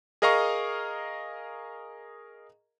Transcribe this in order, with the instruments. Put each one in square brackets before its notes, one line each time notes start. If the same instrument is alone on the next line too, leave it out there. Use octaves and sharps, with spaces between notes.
[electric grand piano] G#4 A#4 D#5 F5 A#5 C#6